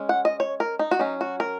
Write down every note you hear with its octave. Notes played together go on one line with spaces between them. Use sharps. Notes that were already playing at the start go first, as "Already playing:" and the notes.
Already playing: G#3 C#4
F#5
D#5
C#5
A#4
D#4
F#4
F#3 C#4 D#4
F#4
A#4